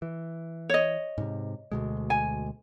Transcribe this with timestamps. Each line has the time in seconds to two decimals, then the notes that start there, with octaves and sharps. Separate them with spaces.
0.02 E3
0.69 C#5 D#5
1.18 G#2 C3
1.72 D2 B2 G#3
2.10 G#5